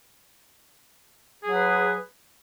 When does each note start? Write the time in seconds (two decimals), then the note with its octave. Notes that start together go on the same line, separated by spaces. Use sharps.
1.43 G#4
1.48 F#3
1.52 B4